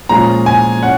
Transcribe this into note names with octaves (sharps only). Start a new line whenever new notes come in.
A#2 F3 G#3 C#4 A#5
G#5
C#4 F#5